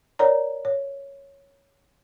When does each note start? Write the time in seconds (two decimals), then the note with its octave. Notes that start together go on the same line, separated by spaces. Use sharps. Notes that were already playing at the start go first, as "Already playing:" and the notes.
0.19 A#4 C#5 D5 A#5
0.65 C#5